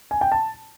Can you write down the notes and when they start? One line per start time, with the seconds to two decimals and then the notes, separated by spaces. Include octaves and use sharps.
0.11 G#5
0.21 G5
0.32 A5